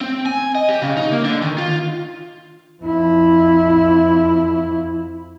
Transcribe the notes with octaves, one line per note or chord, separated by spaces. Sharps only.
C4
G#5
D#5
G4
C#3
D#4
A#3
D3
D#3
F4
F2 E4